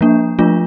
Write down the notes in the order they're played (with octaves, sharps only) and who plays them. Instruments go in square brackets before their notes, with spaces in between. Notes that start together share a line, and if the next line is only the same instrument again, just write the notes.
[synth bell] F3 A#3 D4
F3 A3 D4 F4